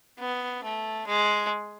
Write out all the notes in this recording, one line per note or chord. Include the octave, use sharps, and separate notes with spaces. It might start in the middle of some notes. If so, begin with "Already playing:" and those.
B3
A3
G#3